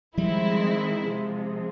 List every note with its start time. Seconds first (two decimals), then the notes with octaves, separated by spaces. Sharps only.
0.18 D#3 F3 G3 G#3 C4 E4
1.05 C3 F3 G#3